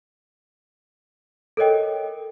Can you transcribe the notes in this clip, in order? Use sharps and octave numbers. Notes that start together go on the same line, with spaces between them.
A4 A#4 C#5 D#5 G5